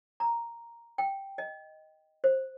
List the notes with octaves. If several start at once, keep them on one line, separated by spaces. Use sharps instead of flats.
A#5
G5
D#5
C5